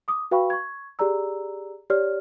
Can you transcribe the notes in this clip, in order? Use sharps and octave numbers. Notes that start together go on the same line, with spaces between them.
D6 D#6
F#4 B4 F5 G5 B5 C#6
C#6 G#6
G4 G#4 D5 A#5 E6
G4 C#5 D5 F6